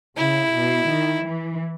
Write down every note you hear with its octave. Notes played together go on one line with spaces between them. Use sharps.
C#3 E4
B2
D#3
E3